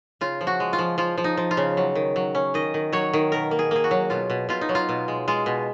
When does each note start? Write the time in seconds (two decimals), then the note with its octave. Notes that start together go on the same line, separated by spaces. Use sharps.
0.21 C#3 F4
0.41 F3
0.47 F#4
0.60 G#3
0.73 F4
0.79 F3
0.98 F3 F4
1.18 F3
1.24 D#4
1.37 F3
1.51 F4
1.57 C#3
1.77 F#3
1.95 D#3
2.16 F#3
2.35 C#4
2.54 D#3 D#5
2.74 D#3
2.93 F#3 C#5
3.13 D#3
3.32 B2 A#4
3.51 A#3
3.59 G#4
3.71 A#3 G#4
3.84 F#4
3.91 F#3
4.10 B2 F4
4.30 B2
4.49 B2 F4
4.61 D#4
4.69 F#3
4.75 F4
4.89 B2
5.08 G#3
5.28 G#3 F4
5.46 B2